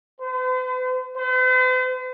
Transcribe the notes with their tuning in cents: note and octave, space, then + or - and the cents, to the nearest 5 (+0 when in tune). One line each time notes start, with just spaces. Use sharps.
C5 -45
C5 -45